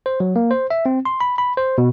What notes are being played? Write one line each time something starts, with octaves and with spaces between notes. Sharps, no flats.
C5
F#3
A#3
C5
E5
C4
C6
B5
B5
C5
B2